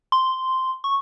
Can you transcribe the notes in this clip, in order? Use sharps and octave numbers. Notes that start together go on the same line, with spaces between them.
C6
C#6